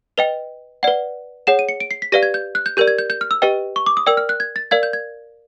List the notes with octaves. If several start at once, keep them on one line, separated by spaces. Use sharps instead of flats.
B4 D#5 G5 F7
B4 D5 F#5
G#4 C#5 F#5 E7
D#7
C#7
D7
C7
B6
G4 B4 D5 F5 A#6
G#6
G6
F#6
G6
G4 A#4 D5 G6
G#6
G6
G6
F6
E6
G4 B4 D#5 G5
C#6
D6
D#6
A#4 D5 G5 E6
F6
F#6
G#6
A6
A#4 D5 F5 G#6
G6
G#6